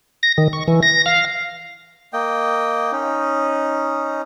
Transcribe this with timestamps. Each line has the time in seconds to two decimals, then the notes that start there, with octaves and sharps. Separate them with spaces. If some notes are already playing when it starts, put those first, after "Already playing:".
0.23 A#6
0.38 D#3
0.53 C#6
0.68 E3
0.83 A#6
1.06 F5
2.13 A#3 D#5 G5
2.92 C#4 D#4